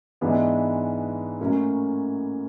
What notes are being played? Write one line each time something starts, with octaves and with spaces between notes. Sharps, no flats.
G#2 E3 G#3 B3 D4
A2 F#3 A#3 C#4